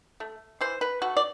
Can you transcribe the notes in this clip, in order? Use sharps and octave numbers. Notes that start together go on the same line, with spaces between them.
A3
E3 C5
B4
A3 F#4
D5